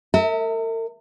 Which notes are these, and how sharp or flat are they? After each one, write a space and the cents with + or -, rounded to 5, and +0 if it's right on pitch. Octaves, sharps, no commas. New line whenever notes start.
A#4 -45 E5 -30